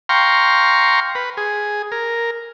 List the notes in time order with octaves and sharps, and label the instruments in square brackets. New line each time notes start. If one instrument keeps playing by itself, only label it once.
[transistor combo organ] F5 G5 A#5 C6 C#6
B4
G#4
A#4